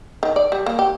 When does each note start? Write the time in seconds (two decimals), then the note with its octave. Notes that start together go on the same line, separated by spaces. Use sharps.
0.23 D#3
0.36 D5
0.52 G3
0.66 A#3
0.79 G4